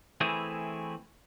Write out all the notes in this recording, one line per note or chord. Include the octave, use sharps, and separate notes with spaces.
E3 A3 C4 E4 G#4